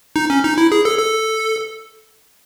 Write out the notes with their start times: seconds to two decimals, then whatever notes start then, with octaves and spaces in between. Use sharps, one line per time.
0.16 D#4
0.30 C#4
0.44 D#4
0.58 E4
0.72 G#4
0.85 A4
0.98 A4